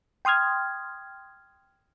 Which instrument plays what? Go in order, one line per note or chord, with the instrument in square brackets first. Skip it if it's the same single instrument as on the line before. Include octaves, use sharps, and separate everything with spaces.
[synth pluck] G5 C6 D#6 F6 G#6